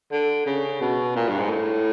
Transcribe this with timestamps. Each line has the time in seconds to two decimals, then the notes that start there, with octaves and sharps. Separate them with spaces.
0.12 D3
0.46 C#3
0.81 B2
1.16 A#2
1.29 G2
1.39 G#2
1.50 A2